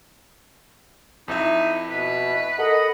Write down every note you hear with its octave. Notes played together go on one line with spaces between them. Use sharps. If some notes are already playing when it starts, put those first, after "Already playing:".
F2 D#4 E4 E5
B2 B4
A4 A#4 D#5 F#5 B5